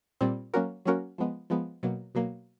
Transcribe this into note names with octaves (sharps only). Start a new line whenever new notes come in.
A#2 G3 C4
F#3 A#3 C#4 F#4 A#4
F#3 A#3 C#4 F#4 A#4
F3 G#3 B3
F3 G#3 B3
B2 F#3 A#3
B2 F#3 A#3